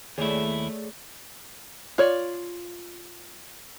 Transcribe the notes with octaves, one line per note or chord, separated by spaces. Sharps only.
D#2 A3 E4 G#4 C#5 D5
F4 C#5 D5